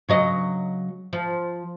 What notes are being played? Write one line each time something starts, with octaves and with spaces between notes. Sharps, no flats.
C#3 F#3 D#5
F3